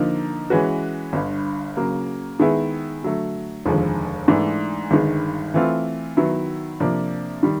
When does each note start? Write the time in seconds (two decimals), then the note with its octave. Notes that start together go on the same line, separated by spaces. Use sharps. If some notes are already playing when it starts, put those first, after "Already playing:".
Already playing: D3 F3 A#3 D#4
0.50 E3 G#3 C#4 F#4 B4
1.13 G1 G2 D3
1.77 C#3 F#3 A#3
2.39 D#3 G#3 B3 E4 G#4
3.03 D3 F#3 A3
3.66 F1 D#2 D3 F3 G#3
4.28 G#2 E3 A3 D4
4.91 G1 G2 D#3 G#3
5.54 E3 A3 C4 F4
6.17 D#3 F#3 B3 E4
6.80 C3 F3 A#3 D4
7.43 D#3 G3